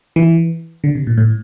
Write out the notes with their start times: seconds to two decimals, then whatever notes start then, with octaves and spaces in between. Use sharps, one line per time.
0.16 E3
0.84 D3
0.95 C3
1.07 A#2
1.17 A2